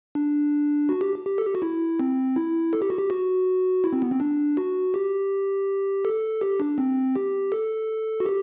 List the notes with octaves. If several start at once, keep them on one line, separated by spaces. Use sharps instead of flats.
D4
F#4
G4
G4
A4
G4
F#4
E4
C4
E4
A4
G4
F#4
G4
F#4
E4
C4
B3
C4
D4
F#4
G4
A4
G4
D4
C4
G4
A4
F#4
G4